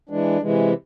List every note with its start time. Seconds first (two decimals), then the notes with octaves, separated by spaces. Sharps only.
0.09 E3 G#3 D4
0.41 C3 E3 G#3